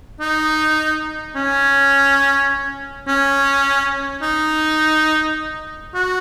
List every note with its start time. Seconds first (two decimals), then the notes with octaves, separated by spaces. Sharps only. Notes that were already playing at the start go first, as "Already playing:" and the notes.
0.20 D#4
1.35 C#4
3.08 C#4
4.22 D#4
5.94 F#4